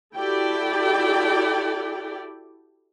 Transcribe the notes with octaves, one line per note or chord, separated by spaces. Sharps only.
E4 F#4 G4 A4 D5 G5